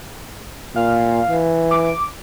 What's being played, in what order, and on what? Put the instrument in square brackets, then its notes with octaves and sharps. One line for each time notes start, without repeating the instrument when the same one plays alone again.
[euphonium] A#2 [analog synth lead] F5
[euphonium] E3
[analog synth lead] D6